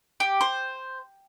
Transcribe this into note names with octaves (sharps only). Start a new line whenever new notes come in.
G4
C5